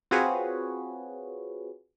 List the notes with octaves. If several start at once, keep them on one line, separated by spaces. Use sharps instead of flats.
C4 F4 F#4 G#4 B4 C#5